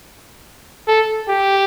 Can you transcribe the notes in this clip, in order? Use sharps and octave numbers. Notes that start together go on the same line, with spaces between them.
A4
G4